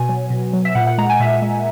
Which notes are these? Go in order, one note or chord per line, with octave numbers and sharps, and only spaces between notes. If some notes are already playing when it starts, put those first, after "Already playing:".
Already playing: B2 G#5
F#3
B2
F#3
E5
A#2 F#5
F#5
G#3 A#5
G#5
A#2 E5
G#3